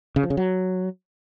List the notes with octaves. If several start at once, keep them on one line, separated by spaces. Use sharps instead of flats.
C#3
F3
C#3
F#3